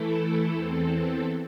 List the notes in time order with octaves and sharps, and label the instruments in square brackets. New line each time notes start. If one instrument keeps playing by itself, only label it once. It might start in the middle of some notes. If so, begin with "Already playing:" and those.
Already playing: [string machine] E3 A3 E4 A4
E2 E3 C4 A4